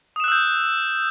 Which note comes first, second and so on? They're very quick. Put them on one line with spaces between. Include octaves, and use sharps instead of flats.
D#6 E7 F#6 E6 G6